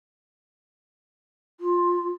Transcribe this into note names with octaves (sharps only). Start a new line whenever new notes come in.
F4